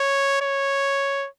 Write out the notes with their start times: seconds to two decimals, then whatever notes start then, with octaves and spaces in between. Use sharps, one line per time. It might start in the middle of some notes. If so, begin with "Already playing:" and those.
Already playing: C#5
0.42 C#5